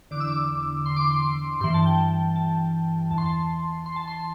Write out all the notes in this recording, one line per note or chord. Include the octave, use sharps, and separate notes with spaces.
E2 D3 D6
E6
D6
C6
D6
C6
G2 E3 C6
A5
G5
A5
E2 E3 A5
C6
A5
C6
A5
C6